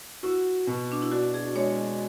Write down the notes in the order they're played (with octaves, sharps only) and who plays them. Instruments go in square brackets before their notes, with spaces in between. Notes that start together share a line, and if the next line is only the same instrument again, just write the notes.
[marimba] E4 [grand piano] F#4
[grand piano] B2
[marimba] D4
E4
[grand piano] D4 [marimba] F#4
[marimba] G#4
[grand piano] G#3 [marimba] C#5